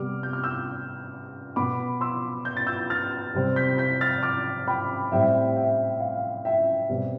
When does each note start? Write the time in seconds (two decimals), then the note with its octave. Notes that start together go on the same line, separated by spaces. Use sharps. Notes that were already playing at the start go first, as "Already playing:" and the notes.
Already playing: C3 G3 B3 D6 F6
0.23 G6
0.33 F6
0.43 E6 G6
1.56 B2 B3 B5 D6
2.01 C6 E6
2.45 G6
2.57 A6
2.67 E6 G6
2.90 F6 A6
3.34 C3 G3 C4
3.56 G6 B6
3.78 G6 B6
4.01 F6 A6
4.23 D6 F6
4.68 G5 B5
5.12 A2 G3 C4 E5 G5
5.56 E5 G5
6.00 F5
6.45 E5 G5
6.89 B2 G3 C4